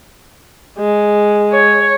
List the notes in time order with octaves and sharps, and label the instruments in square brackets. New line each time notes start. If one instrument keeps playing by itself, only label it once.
[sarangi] G#3
[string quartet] C#5